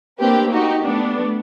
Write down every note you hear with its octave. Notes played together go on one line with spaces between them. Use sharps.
A3 A#3 C4 D4 G4 B4
D#4 F#4 G4
A3 B3 D4